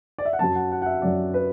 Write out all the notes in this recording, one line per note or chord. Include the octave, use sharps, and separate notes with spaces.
D5
E5
F#5
F#2 F#3 A5
F#5
F#5
F#5
E5
F#2 F#3 D5
B4